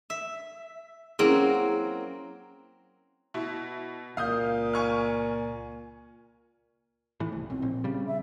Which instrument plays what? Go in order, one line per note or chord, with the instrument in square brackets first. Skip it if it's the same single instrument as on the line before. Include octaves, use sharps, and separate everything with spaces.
[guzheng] E5
[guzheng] F#3 A#3 C4 [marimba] C#4 E4 [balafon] G#4
[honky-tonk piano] B2 E4
[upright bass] C#2 [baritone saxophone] A#2 [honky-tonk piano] F5 D#6 G6
[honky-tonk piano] G#5 C#6 F6
[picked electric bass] A2 E3
C2
[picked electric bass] B1 [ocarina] C4
[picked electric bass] A#1
C#3 G3
[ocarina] E5